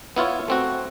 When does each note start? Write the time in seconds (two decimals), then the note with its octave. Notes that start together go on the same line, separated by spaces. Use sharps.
0.16 B3 E4 F4 C#5
0.48 A3 C4 F#4